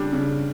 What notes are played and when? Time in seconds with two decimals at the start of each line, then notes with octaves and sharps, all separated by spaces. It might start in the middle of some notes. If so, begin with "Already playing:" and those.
Already playing: C#3 G3 D4
0.13 C#3